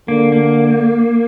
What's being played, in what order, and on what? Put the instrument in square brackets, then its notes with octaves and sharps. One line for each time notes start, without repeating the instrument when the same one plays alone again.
[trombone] D3 [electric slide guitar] A#3
[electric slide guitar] A#3